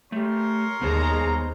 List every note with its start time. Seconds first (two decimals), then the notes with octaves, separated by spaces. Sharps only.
0.12 A3 G4 A#4 C#5 C6
0.81 D#2 G#3 B3 C5 A5 A#5